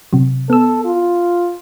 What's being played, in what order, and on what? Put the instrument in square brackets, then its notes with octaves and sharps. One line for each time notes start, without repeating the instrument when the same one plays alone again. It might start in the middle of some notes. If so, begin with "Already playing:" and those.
[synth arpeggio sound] C3 F#3
[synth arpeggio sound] B3 E6 [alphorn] A4
[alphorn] F4